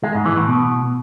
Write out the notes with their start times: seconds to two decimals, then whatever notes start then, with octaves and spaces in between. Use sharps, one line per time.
0.04 G#3
0.15 G#2
0.26 E3
0.36 A2
0.47 B2